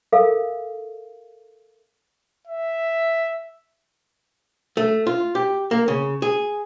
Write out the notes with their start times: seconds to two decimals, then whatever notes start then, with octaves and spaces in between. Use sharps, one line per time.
0.12 A4 A#4 E5 F5
2.47 E5
4.77 A3
5.07 F4
5.35 G4
5.71 A#3
5.88 C#3
6.22 G#4